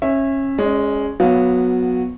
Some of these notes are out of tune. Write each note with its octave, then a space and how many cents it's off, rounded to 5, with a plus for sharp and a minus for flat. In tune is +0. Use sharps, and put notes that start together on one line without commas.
C#4 -25 E5 +0
G#3 +0 C#4 +0 D5 +35
F#3 -15 B3 +0 F5 +0